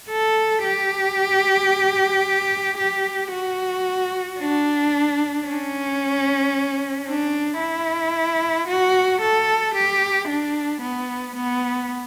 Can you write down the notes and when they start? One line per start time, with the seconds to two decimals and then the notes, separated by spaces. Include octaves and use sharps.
0.10 A4
0.64 G4
2.78 G4
3.31 F#4
4.39 D4
5.46 C#4
7.07 D4
7.60 E4
8.68 F#4
9.21 A4
9.75 G4
10.28 D4
10.82 B3
11.36 B3